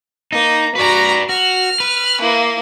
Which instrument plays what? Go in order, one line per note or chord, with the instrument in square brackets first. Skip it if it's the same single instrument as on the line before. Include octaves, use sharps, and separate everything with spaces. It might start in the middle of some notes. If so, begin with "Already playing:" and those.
[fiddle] A#3 A#5 [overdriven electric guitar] D#4
[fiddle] F#4 A#5 [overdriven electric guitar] B4 D5
[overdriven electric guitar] F#4 [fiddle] F6
[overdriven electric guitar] B4
[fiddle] A#3 E4